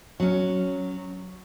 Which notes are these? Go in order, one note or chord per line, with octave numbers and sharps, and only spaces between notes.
F#3 C#4